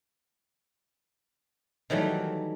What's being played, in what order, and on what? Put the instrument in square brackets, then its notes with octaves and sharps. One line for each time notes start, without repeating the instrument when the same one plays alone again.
[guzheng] D#3 E3 F#3 G3 A3